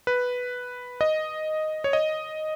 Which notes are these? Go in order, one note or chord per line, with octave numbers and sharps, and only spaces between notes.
B4
D#5
C#5
D#5